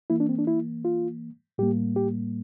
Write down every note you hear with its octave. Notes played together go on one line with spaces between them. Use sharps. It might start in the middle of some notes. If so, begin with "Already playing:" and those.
E3 A#3 E4
D4
C4
D4
E4
F4
A2 G3 A#3 G4
G4